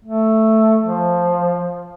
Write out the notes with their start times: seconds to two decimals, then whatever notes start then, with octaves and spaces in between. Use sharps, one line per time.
0.05 A3
0.81 F3